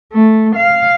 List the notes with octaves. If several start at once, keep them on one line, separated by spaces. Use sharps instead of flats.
A3
F5